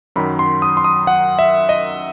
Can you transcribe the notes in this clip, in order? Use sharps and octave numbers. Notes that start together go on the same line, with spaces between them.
F#2 D#3 F#3 B5
C6
D#6
C6
D#6
F#5
E5
D#5